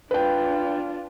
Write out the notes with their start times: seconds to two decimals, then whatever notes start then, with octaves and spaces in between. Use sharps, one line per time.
0.11 D4 F4 B4 G5